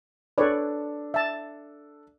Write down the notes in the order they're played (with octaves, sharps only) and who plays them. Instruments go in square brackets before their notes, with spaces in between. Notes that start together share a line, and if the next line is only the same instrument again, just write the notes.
[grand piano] D4 A4 [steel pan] B4 C#5 D5
[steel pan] E5 A5